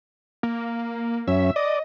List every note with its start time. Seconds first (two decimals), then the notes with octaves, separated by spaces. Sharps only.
0.43 A#3
1.28 F#2 C#4 E5
1.56 D5 D#5